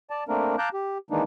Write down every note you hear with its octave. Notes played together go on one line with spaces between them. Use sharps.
D5 A5
A3 A#3 C4 D4 A#4
F5 A5 A#5 D6 F#6 G6
G4
D#3 E3 G#3 A#3 D4 D#4